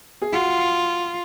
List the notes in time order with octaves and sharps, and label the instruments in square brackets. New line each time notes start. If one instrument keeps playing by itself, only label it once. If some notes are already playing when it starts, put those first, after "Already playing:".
[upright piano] G#4
[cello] F4 [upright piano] F#4